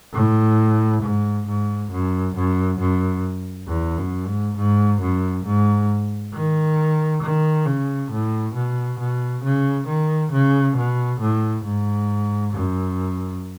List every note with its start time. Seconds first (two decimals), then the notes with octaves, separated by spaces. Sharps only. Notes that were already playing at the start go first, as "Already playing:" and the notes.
0.14 A2
1.02 G#2
1.46 G#2
1.91 F#2
2.35 F#2
2.79 F#2
3.68 E2
3.97 F#2
4.26 G#2
4.57 G#2
5.01 F#2
5.45 G#2
6.34 D#3
7.22 D#3
7.66 C#3
8.11 A2
8.54 B2
8.99 B2
9.43 C#3
9.87 D#3
10.32 C#3
10.77 B2
11.20 A2
11.64 G#2
12.53 F#2